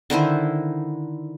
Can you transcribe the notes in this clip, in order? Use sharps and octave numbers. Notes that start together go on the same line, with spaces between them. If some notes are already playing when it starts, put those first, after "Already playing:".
D3 D#3 E4 C5